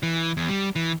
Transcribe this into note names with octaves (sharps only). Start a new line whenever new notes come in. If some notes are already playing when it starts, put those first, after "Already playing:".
E3
E2
G3
E3